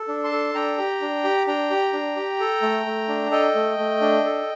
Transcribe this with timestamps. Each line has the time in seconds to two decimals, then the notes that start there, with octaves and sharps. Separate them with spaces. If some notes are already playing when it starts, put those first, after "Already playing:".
Already playing: A4
0.08 D4
0.24 A5 C6
0.32 A4
0.54 D4 G5 A#5
0.78 G4
1.02 D4
1.24 G4
1.47 D4 G5 A#5
1.70 G4
1.93 D4
2.16 G4
2.40 A4
2.62 A3
2.86 A3
3.09 D4
3.31 A4 D#5 G5
3.55 A3
3.78 A3
4.01 D4
4.25 A4